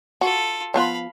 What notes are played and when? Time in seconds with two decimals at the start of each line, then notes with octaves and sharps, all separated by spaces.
0.21 F4 F#4 A4
0.74 F3 B3 F4 F5 B5